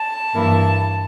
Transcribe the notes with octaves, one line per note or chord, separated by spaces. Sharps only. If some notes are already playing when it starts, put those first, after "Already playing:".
Already playing: A5
G2 E3 A#3 E4